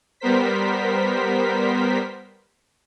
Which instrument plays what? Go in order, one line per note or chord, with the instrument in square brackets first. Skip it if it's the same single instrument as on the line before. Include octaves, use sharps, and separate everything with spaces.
[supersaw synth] G3 B3 A#4 C5 B6